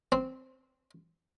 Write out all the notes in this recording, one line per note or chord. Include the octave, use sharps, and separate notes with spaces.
C4